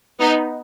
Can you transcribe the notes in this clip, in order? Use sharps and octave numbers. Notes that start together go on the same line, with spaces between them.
B3 D#4